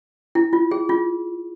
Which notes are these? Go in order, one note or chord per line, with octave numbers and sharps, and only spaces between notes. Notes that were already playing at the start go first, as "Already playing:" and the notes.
E4
F4
G#4
F4